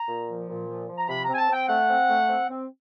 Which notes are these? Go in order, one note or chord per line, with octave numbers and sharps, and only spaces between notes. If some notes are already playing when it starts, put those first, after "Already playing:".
Already playing: A#5
A#2
F3
A#2
F3
F3
A#5
C3 B5
C4 A#5
G#5
A5
C4 G5
A3 F#5
C4
A3
C4
C4